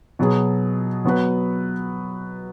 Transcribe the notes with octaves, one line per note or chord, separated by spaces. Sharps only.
B2 F#3 B3 G#4
F#3 B3 F#4 B4